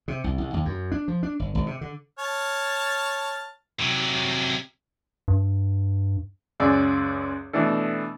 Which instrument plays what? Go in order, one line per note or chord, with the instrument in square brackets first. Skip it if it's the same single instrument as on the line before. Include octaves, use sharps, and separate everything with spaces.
[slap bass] C3
C2
C2
D#2
F#2
D4
F3
D4
G1
G#1
C3
D3
[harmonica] C#5 A5 F6
[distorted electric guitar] C3 F#3
[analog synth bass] G2
[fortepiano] C#2 F#2 G#4 D5 E6
B2 E3 A3 D4 A4